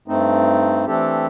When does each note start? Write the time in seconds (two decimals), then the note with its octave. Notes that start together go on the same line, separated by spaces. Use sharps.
0.08 G2 A3 C4 D#4
0.87 E3 A3 C4 D4 G4 A4